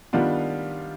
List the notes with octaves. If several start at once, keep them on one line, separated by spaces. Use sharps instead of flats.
D#3 G3 B3 D4 F4